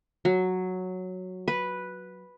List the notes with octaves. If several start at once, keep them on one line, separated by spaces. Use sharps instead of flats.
F#3
B4